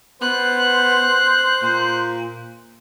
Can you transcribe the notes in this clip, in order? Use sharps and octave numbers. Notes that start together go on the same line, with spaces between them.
B3 C5 F#6
A#2